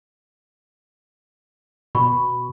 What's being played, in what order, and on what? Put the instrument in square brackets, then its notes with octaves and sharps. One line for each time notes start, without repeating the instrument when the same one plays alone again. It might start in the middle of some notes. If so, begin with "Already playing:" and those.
[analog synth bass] B2 [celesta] B5 C#6